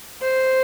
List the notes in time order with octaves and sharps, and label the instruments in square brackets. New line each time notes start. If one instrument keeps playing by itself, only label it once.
[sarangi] C5